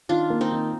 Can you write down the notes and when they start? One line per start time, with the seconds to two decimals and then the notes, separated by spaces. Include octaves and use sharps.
0.09 D#3 D4 F4
0.30 A#3
0.41 C4 D#4
0.52 D#3